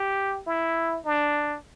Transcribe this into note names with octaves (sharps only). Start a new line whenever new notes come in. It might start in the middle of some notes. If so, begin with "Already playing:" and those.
Already playing: G4
E4
D4